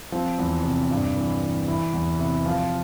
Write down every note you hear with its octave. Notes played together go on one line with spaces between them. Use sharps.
F3 C4
E2
C3
G2
E3
E3
E3 E4
E2
C3 E4
F3 F4